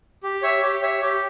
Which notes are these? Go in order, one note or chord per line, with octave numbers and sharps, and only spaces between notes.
G4
C#5 E5
G4
C#5 E5
G4